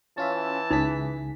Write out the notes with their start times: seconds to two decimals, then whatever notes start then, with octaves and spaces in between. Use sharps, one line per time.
0.18 E3 C#4 F4 E5 A5
0.71 C#2 D#4 G#4 B6